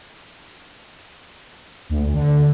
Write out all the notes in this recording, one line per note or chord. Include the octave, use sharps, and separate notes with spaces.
D2
D3